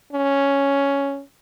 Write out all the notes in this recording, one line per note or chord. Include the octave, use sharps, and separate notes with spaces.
C#4